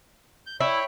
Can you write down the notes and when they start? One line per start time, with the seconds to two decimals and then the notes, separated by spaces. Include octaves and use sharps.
0.46 G6
0.60 E4 C#5 G5 B5